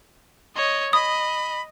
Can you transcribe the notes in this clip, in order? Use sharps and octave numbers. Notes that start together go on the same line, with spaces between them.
C#5 D#5
D#5 B5 D#6